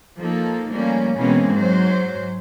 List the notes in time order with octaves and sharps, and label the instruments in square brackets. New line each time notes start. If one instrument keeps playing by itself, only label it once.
[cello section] F3 A#3 D#4 A4
F3 G3 A3 A#3 C#4
B2 E3 G#3 A#3 C4 C#4
G#2 F#3 C5